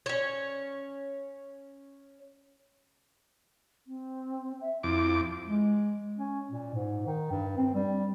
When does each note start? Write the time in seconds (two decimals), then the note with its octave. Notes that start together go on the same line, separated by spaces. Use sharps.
0.06 C#4 C#5
3.87 C4
4.61 E5
4.83 F2 E4 D6
5.47 G#3
6.18 C#4
6.51 A#2
6.74 G#2
7.06 D#3
7.31 G2
7.58 C4
7.75 G3